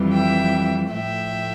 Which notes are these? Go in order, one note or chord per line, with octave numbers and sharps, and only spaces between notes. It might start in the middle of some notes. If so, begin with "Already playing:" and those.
Already playing: F2 E3 G3
E5 G5
A2 F3 A3 E5 G5